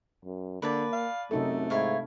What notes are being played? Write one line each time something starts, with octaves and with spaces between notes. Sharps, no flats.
F#2
D3 A#3 B4 D5 A5
F5
F#2 C3 A3 D#4 A4
G#2 E4 C#5 F5